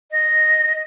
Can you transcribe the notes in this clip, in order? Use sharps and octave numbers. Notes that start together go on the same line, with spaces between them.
D#5